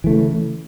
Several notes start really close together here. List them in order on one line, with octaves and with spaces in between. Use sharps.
E3 A3 C#3